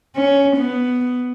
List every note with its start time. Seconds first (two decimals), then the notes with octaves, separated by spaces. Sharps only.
0.16 C#4
0.56 B3